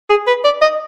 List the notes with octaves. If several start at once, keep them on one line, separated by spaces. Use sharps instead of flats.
G#4
B4
D5
D#5